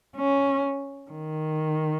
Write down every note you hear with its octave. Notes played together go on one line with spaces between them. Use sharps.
C#4
D#3